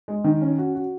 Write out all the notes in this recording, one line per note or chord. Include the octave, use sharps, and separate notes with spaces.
G#3
D#3
C#4
F#4
F#4